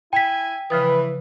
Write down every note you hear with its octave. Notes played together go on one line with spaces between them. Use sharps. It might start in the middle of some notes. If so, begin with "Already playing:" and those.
E4 G5 G#5 B6
C#3 E3 F3 B4 D#6